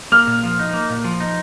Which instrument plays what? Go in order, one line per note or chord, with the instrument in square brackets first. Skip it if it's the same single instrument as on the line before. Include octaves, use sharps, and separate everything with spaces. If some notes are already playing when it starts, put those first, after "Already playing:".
[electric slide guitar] A#3 [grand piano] F6
[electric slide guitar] A#2
F3
D#4
A#3
A#2
F3
D#4